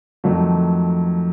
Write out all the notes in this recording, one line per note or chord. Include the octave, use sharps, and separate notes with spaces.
F2 D#3 F#3 A3